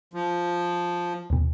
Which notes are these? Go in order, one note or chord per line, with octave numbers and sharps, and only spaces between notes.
F3
D#2 B2